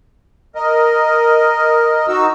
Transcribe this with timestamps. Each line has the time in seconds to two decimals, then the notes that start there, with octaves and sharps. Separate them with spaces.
0.55 A#4 D#5
2.08 D#4 F#4 E6